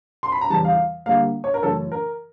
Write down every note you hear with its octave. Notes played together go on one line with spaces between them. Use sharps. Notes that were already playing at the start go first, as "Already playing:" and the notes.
C6
B5
A#5
E2 C#3 E3 G3 A5
F5
D3 G3 A#3 F5
C#5
A#4
F#2 C#3 E3 A3 C#4 A4
A#4